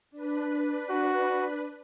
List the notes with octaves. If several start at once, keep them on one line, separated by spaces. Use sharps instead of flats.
D4 B4
F#4